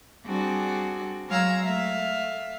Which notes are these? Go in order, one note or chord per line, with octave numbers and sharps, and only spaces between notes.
G3 C4 D4 F#4 G#4
F#3 G#3 C#5 F5 A#5 E6
A3 E5 F5